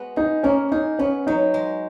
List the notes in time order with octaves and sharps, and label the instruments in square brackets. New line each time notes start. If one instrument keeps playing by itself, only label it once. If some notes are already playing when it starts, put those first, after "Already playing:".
Already playing: [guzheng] G#3 B3 F#4
[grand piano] D#4 [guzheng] G#4
[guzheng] A#3 [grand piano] C#4
[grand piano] D#4 [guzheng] G#4
[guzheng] B3 [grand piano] C#4
[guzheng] F#3 [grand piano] D#4
[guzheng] G#3